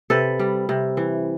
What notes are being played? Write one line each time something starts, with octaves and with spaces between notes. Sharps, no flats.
C3 A4 B4
G3
C3
E3